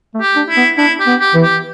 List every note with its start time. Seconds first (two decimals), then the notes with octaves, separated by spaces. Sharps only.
0.14 A3
0.21 G4
0.36 D4
0.49 E4
0.56 B3
0.77 D4 E4
1.00 G4
1.06 B3
1.20 G4
1.34 E3
1.42 G4